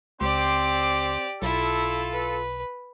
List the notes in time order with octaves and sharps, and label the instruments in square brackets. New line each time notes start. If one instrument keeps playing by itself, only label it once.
[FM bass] C#2 [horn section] C4 C5 [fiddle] G4 D5
[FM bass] B1 [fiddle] E4 [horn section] F4 A4
[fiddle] B4